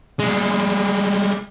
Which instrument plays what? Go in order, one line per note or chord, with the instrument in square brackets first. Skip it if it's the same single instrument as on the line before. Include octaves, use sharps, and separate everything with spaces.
[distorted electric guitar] G3 G#3